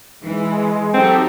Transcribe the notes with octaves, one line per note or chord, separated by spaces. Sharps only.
E3 G#3
F#3 C4 D#4 F#4 G4 A4